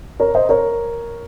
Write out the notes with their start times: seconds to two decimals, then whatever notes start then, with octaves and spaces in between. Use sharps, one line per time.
0.20 A#4 C#5
0.35 C5 D#5
0.49 A#4 C#5